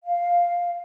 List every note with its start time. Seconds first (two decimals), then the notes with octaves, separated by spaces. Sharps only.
0.05 F5